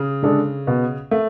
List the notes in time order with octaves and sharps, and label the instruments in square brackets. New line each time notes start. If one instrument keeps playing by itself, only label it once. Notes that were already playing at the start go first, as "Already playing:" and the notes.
Already playing: [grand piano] C#3
[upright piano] D3 G#3 D4 A4
B2
A3